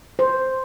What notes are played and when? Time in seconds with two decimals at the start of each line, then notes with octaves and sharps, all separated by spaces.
0.19 C5